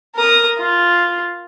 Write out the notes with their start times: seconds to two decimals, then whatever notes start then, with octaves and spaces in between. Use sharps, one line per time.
0.15 A#4 D#6
0.58 F4